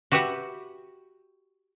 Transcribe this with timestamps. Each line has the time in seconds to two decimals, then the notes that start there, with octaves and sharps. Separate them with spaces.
0.12 F#4 G4 B4 E5 F#5